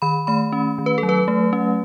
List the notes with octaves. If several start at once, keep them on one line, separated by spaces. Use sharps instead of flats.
D#3 B5
A3 B5
C#4
D#3
B4
A4
F#3
B4
A3
C#4